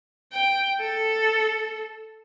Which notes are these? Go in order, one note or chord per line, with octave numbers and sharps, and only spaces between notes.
G5
A4